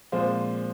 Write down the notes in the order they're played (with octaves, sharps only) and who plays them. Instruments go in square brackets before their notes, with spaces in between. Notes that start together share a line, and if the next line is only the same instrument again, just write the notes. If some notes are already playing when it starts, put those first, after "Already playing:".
[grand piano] A#2 F3 G#3 C4 F4